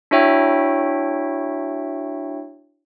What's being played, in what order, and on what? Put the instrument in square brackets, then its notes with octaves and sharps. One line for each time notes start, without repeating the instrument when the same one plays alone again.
[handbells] D4 E4 F#4 C#5 E5 G5